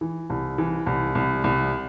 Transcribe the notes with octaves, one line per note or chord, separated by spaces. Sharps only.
E3
C2
E3
C2
C2
C2